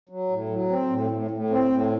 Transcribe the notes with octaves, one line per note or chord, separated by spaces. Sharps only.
F#3
A2
F#3
C4
A2
A2
A2
C4
A2